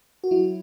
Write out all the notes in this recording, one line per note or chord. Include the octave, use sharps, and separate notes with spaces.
F#4
F#3 E4